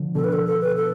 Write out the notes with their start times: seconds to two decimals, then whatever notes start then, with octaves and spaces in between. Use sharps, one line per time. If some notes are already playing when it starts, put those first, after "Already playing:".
Already playing: D3 F3
0.15 B2 D3 A4
0.24 B4
0.33 A4
0.46 A4
0.61 B4
0.77 A4